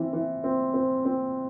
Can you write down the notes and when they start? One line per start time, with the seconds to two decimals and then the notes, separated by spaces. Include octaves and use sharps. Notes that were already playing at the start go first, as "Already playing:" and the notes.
Already playing: E3 C4
0.13 E3
0.44 C4
0.74 C4
1.05 C4